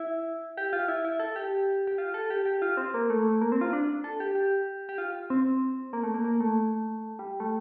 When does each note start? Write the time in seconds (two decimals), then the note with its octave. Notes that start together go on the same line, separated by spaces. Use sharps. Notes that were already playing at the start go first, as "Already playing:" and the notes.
Already playing: E4
0.57 G4
0.73 F4
0.88 E4
1.05 E4
1.20 A4
1.36 G4
1.87 G4
1.98 F4
2.14 A4
2.30 G4
2.46 G4
2.62 F4
2.77 C4
2.94 A#3
3.10 A3
3.41 A#3
3.52 C4
3.61 F4
3.73 D4
4.04 A4
4.20 G4
4.35 G4
4.89 G4
4.98 F4
5.30 C4
5.93 A#3
6.03 A3
6.14 A#3
6.24 A#3
6.40 A3
7.19 G3
7.40 A3